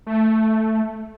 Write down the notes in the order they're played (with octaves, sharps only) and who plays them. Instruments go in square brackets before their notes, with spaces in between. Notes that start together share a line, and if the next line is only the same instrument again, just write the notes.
[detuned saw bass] A3